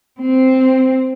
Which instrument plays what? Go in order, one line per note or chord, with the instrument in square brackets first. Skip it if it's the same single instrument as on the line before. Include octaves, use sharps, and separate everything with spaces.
[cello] C4